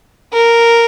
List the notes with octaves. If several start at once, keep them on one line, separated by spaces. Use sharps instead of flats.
A#4